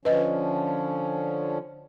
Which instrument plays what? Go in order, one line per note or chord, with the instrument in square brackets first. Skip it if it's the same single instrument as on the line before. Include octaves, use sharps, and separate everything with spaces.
[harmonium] D3 F3 C#4 [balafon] B4 D#5